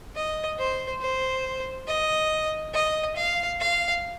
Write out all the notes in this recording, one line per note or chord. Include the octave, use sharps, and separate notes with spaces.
D#5
C5
C5
D#5
D#5
F5
F5